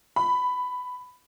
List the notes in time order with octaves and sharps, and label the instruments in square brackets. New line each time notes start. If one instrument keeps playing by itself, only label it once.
[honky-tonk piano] B5